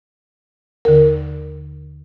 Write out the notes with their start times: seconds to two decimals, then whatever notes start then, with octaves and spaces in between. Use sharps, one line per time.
0.85 D#2 D3 A#4